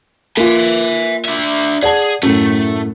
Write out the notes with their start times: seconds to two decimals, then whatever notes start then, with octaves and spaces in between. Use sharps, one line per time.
0.37 A#3 F4 E5 G#5
1.25 D4 E5
1.83 G#4 D5 F#5 A5
2.23 F#2 A2 A3